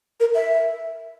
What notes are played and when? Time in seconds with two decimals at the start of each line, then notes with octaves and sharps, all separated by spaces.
0.20 A#4
0.35 E5